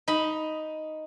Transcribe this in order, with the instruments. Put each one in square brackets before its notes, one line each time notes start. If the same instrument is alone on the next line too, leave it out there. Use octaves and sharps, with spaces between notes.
[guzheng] D#4 B5